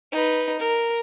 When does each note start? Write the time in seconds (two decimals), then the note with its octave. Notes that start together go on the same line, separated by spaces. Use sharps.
0.12 D#4 B4
0.59 A#4